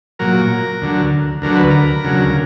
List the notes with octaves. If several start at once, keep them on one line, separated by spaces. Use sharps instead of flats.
A#2 F#3 A#4
D2 D3 F#3
D2 D3 F#3 A#4
B4
A#4
D2 C#3 F#3